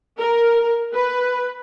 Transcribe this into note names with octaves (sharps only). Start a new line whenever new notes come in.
A#4
B4